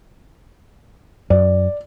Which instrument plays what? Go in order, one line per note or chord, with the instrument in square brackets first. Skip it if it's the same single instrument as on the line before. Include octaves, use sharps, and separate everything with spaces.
[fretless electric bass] F#2 [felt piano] D5